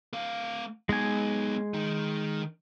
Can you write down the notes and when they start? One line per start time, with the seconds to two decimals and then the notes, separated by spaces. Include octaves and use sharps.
0.13 A3 F5
0.89 G#3 B3 D#4 G#5
1.74 D#3 D#4